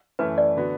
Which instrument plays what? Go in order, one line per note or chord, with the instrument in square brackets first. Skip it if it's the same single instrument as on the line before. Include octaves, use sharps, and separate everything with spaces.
[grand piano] F#2 E3 A3 E4 [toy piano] B4
[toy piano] D5
[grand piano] D3 B3 F#4